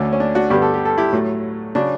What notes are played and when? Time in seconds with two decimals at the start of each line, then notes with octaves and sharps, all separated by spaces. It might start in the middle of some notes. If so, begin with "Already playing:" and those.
Already playing: D2 D3 A3 C#4
0.13 C#4
0.20 D4
0.35 D4 F#4
0.50 G2 D3 G3 B3 G4
0.62 A4
0.74 G4
0.85 A4
0.98 E4 G4
1.13 A2 F#3 A3
1.75 C#3 F#3 D4